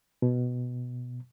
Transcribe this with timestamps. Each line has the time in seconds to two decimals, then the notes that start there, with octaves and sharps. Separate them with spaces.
0.22 B2